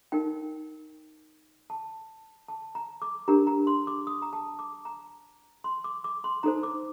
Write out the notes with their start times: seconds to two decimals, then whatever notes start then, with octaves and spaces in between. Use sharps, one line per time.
0.12 D#4 A#4 G5
1.70 A5
2.48 A5
2.75 A#5
3.02 D6
3.28 D4 G4 A#4 A#5
3.47 A#5
3.67 C6
3.87 D6
4.07 D#6
4.22 A#5
4.33 A5
4.59 D6
4.85 A#5
5.64 C6
5.84 D6
6.04 D6
6.24 C6
6.43 D#4 A4 C5 A#5
6.63 D6